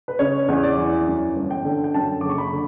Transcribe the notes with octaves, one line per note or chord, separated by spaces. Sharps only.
B4
C#3 C#5
E2
D5
E3
F#2
G1
G5
D3
G5
F#2 A5
F#1 D6
C#6
B5
D3